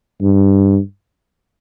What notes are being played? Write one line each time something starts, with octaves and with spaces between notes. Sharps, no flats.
G2